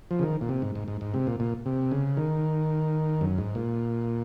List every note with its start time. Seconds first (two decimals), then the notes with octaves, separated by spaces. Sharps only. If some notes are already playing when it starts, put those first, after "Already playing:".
0.11 F3
0.19 C#3
0.23 D#3
0.41 A#2
0.49 C3
0.62 G#2
0.75 G#2
0.88 G#2
1.01 G#2
1.14 C3
1.27 A#2
1.40 A#2
1.66 C3
1.92 C#3
2.17 D#3
3.21 F#2
3.38 G#2
3.55 A#2